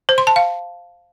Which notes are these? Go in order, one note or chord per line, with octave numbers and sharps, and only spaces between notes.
C5
C6
A5
F5